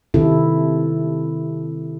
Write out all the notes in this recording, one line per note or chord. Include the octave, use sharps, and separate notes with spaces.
C3 D#3 E4 A4